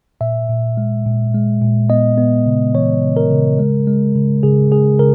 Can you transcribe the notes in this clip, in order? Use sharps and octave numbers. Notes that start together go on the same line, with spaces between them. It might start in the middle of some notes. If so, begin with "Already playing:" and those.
A#2 E5
A#2
G#3
A#2
G#3
A#2
B3 D#5
B3
C#3
E3 C#5
C#3
A#4
C#3
G#3
G#3
C#3
C#3 G#4
G#3 G#4
C#3 A#4